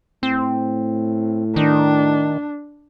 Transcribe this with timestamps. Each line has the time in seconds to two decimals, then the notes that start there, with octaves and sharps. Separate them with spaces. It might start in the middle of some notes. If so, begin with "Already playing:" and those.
0.23 A2 C4
1.56 D#3 D4